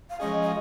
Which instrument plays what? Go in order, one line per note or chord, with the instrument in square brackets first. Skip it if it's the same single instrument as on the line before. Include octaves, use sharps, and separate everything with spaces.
[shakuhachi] F5
[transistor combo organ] F3 G#3 C#4 G#4 [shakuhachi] D#5
[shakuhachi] D#5